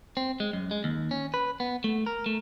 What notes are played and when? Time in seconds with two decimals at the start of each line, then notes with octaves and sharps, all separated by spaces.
0.17 C4
0.40 G#3
0.53 F#2
0.71 G#3
0.84 D#2
1.11 C#4
1.34 B4
1.60 B3
1.84 A3
2.06 A#4
2.26 A3